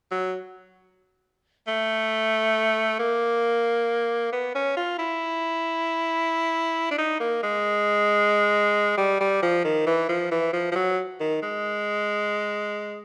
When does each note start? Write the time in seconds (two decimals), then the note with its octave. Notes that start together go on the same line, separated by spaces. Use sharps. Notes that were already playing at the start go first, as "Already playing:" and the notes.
0.11 F#3
1.67 A3
2.99 A#3
4.33 B3
4.55 C#4
4.77 F4
4.99 E4
6.91 D4
6.99 D#4
7.20 A#3
7.43 G#3
8.98 G3
9.21 G3
9.43 F3
9.65 D#3
9.87 E3
10.09 F3
10.32 E3
10.53 F3
10.72 F3
10.76 F#3
11.20 D#3
11.43 G#3